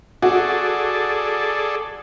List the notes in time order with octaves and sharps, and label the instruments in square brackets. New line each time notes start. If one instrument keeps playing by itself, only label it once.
[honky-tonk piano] F#4 [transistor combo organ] G#4 A4 D5